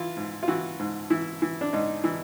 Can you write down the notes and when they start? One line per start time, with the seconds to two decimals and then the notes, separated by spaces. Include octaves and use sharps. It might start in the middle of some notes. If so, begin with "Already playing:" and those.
Already playing: E3 F4
0.17 G#2
0.43 F4
0.48 E3 F#4
0.79 G#2
1.10 E3 E4
1.42 E3
1.61 D4
1.73 G#2 D#4
2.04 E3